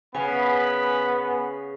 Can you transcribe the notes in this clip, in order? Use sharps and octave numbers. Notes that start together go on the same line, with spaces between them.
C#3 B3 G#5 B5